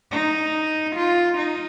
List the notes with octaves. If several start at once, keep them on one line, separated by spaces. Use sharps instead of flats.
D#4
F4
D#4